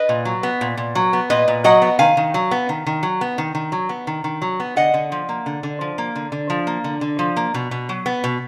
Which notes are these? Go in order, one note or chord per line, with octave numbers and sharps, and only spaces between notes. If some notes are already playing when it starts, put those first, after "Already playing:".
Already playing: B4 D#5
A#2
F#3
B3
A#2
A#2
F#3
B3
A#2 B4 D#5
A#2
F#3 D#5 F#5
B3
D#3 F5 G#5
D#3
F#3
B3
D#3
D#3
F#3
B3
D#3
D#3
F#3
B3
D#3
D#3
F#3
B3
D3 D#5 F#5
D3
F3
A#3
D3
D3
F3
A#3
D3
D3
F3
A#3
D3
D3
F3
A#3
B2
B2
F#3
B3
B2